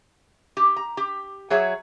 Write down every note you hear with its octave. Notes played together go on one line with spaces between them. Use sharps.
G4
A#5
G4
F#3 G#4 C#5 E5